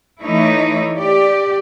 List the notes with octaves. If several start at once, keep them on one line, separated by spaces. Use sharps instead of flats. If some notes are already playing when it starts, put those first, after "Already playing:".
E3 A3 D#4 E4 C#5
G4 D5